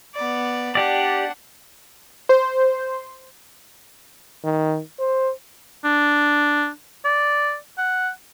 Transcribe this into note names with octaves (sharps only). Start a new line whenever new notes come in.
B3 D5
D4 G4 D5 F#5
C5
D#3
C5
D4
D5
F#5